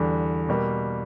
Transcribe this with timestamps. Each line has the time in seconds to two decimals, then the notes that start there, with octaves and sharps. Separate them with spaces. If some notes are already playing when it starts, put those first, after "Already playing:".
Already playing: E2 D3 G3
0.49 B2 G3 A#3